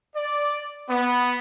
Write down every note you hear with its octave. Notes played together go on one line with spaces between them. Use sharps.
D5
B3